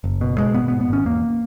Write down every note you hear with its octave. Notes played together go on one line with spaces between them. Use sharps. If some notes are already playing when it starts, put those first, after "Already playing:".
F#1
B2
B2 G#3
G#1 B3
G#2 B3
B3
G#1 C#4
E2 A#3